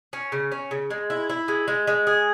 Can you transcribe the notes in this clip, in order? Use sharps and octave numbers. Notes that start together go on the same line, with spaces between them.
C#4
C#3
C#4
C#3
G#3
E4
E4
G#3
G#3
G#3
G#4